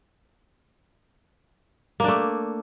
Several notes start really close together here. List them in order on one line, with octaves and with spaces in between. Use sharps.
A#3 D4 A3